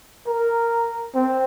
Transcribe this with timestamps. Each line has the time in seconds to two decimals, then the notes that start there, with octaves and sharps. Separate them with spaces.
0.27 A#4
1.15 C4